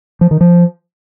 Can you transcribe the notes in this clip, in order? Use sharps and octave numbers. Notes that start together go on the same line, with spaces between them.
F3
D#3
F3